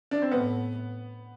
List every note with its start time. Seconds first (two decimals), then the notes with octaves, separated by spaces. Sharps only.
0.11 D4
0.22 C4
0.31 A2 B3